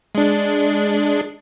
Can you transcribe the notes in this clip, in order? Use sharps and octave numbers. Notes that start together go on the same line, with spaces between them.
G#3 D4